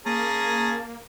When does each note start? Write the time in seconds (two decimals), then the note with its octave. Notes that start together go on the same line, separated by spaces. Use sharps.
0.06 A#3 C#4 G#4 A5 A#5